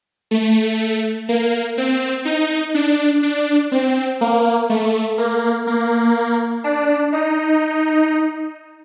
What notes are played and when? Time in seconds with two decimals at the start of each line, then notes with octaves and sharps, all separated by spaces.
0.31 A3
1.29 A#3
1.78 C4
2.25 D#4
2.74 D4
3.23 D4
3.72 C4
4.21 A#3
4.70 A3
5.18 A#3
5.67 A#3
6.64 D4
7.13 D#4